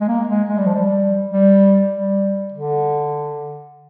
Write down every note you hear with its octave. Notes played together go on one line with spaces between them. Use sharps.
G#3
A#3
G#3
G#3
G3
F3
G3
G3
G3
D3